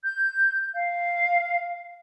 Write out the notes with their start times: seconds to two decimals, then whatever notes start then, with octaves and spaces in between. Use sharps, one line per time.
0.03 G6
0.74 F5